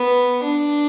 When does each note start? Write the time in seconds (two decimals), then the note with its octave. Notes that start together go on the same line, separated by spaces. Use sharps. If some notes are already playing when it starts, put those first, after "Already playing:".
Already playing: B3
0.44 D4